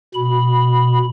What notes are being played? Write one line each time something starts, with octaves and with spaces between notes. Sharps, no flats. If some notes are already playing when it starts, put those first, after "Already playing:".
B2 B5